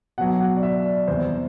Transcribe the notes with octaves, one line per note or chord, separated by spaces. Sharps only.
B2 F#3 F#5
F#5
D5
E5
D5
E2 C3 G3 C5